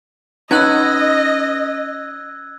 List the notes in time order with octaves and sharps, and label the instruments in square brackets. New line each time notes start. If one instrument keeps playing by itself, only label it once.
[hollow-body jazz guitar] C#4 B4 F#5 [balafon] D#4 [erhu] D#5 [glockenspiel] E6 F#6 G#6